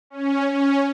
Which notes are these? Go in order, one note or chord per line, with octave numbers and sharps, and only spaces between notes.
C#4
C#4